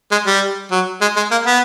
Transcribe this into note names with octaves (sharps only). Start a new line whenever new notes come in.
G#3
G3
F#3
G#3
G#3
A#3
B3